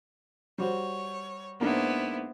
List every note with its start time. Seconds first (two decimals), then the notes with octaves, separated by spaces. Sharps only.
0.58 G3 F#4 C5 C#5
1.61 G#2 A#3 B3 D4 E4 C5